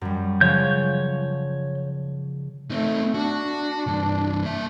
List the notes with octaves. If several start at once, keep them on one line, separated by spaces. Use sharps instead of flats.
F#2 G3
C#3 F3 C#5 G6
A3 C4 D#4
D4 F#4
C2 G2
A#3 E5